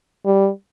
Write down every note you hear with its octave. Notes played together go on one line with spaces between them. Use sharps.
G3